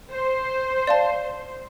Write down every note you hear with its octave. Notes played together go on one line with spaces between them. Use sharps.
C5
D5 F5 A5